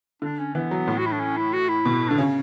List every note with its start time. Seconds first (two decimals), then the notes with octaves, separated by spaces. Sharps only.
0.22 D3 D4
0.39 C#4
0.55 E3 B3
0.71 F#3
0.87 A2
0.98 F#4
1.06 E4
1.13 D4
1.20 C#4
1.37 E4
1.53 F#4
1.69 E4
1.85 B2
2.09 D3 D4
2.18 C#3 C#4